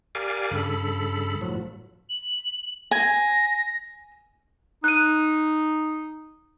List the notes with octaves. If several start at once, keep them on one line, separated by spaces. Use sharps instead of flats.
G4 A#4 D5 F5 G#5
G2 C#3 A4 B5
A2 F3 F#3
F#7
G#5 A#6
D#4 F#6 D#7